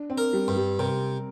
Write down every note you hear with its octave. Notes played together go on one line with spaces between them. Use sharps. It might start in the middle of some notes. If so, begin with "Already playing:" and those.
Already playing: D4
C4
A#4
G3
G2
G3
C3 A#4